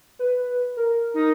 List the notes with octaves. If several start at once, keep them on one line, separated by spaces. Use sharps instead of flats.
B4
A#4
D#4